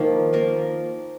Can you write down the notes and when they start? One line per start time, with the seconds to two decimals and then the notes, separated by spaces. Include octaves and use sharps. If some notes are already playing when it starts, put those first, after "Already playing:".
Already playing: D#3 F3 A#3 F4 A#4
0.33 F3 A#3 F4 A#4